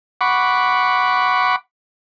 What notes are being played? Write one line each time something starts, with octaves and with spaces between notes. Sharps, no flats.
F#5 B5 C#6 D6